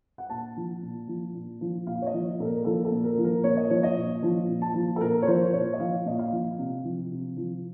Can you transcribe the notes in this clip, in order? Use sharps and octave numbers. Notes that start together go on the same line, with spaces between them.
F#5
A#2 A5
F3
A#2
F3
A#2
F3
A#2 F5
C#5
D#5
F3
A#2 A4
A#4
F3 A4
A4
A#2
A#4
F3
A#4
A#2 C#5
D#5
F3 C#5
D#5
A#2
F3
A#2
A5
F3
A4
A#2 A#4
C#5
F3 C5
A#2 C#5
D#5
F3 F5
A#2 D#5
F5
F3
C3
F3
C3
F3